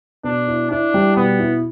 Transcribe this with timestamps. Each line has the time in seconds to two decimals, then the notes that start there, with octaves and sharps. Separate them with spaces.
0.24 B2 D4
0.48 E4
0.70 D4 E4
0.94 G3
1.16 B2 B3
1.39 E4